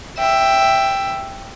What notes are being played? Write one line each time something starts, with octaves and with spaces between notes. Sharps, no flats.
E5 G5